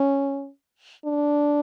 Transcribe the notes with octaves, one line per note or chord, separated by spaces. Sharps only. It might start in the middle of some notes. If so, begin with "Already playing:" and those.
Already playing: C#4
D4